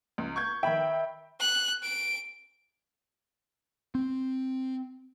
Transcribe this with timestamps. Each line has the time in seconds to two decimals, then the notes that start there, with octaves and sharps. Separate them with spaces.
0.18 C#2
0.36 C#6 G6 G#6
0.63 D#3 E5 G5 B5
1.40 F#6
1.83 D7
3.95 C4